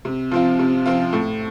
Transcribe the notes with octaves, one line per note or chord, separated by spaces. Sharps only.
C3
F3 C4 F4
C3
F3 C4 F4
A2